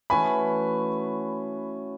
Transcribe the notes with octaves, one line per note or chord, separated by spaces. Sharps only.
E3 A3 C#4 F#4 G#5 B5